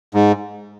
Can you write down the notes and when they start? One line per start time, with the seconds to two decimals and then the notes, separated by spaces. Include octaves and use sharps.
0.14 G#2